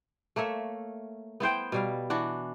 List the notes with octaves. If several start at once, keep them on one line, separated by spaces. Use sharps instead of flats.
A3 A#3 C#5 E5
B3 E4 C5 G5
B2 G3 F5
E3 D4 F#4